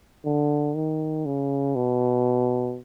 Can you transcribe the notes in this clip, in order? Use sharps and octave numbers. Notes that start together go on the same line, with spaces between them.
D3
D#3
C#3
B2